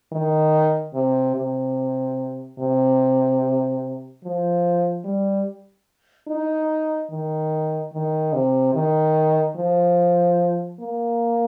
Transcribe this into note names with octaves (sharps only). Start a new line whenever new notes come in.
D#3
C3
C3
C3
F3
G3
D#4
D#3
D#3
C3
D#3
F3
A#3